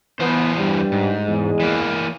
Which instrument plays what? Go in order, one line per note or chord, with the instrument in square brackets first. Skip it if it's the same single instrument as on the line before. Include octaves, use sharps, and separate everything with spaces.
[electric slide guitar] E2 E3 C5 [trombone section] B3
[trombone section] G2 G3
[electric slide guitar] G#2
[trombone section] E2 G#3
[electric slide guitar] E3 A#3